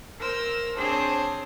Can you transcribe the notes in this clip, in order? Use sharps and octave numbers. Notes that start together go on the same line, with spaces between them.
A#4 C5 E6
C4 D4 G#4 C5 C#5